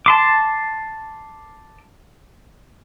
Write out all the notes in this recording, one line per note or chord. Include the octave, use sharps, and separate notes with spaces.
A5 C6 D6